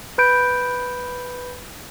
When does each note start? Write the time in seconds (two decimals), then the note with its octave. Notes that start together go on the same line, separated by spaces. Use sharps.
0.18 B4 B5 G6 D7